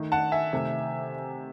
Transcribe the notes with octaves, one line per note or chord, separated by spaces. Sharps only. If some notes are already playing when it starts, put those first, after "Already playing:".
Already playing: D#3 A3
F#5 A5
E5 G#5
C3 D#3 A3